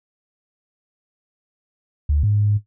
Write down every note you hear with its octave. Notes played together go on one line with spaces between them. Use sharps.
D2
G#2